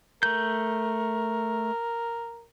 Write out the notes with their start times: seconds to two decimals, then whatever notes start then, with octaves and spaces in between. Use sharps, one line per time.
0.23 A3 A#4 G6